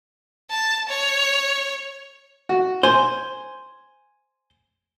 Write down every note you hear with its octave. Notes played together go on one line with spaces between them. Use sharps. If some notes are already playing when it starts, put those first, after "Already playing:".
A5
C#5
F#4
C5 G#5